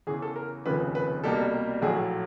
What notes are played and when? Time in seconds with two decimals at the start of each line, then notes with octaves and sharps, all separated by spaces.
0.07 E2 C#3 E3 G#4
0.22 A4
0.36 A#4
0.65 F1 D#2 C#3 F3 A3 B4
0.95 B4
1.24 C2 B2 G3 A#3 A4
1.82 A#1 A2 F#3 A3 G#4